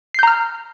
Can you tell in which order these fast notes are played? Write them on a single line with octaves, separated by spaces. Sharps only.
C7 G6 A#5 F6